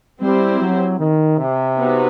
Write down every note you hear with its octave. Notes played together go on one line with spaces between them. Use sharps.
G3 C4 E4 G4 C5
F#3
D#3
C3
B3 D#4 F#4 B4